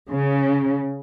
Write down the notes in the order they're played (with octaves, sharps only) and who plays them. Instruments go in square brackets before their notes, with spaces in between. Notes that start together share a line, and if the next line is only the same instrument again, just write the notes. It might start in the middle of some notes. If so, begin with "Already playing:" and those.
[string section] C#3